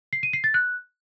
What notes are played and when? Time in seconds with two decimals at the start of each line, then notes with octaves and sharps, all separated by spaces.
0.13 C7
0.23 D#7
0.33 C7
0.44 A6
0.54 F#6